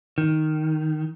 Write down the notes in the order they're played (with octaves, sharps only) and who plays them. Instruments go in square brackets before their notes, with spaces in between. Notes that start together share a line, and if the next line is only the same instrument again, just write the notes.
[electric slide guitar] D#3